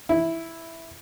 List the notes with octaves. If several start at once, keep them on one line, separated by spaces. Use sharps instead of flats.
E4